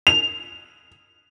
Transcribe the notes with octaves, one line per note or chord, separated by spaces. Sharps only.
F7